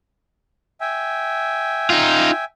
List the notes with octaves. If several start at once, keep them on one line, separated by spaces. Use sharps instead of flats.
E5 G5 G#5
D#4 F4